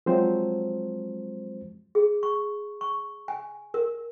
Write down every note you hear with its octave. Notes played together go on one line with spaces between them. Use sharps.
F3 F#3 G#3 C4 C5
G#4
C#6
C#6
G#5
A#4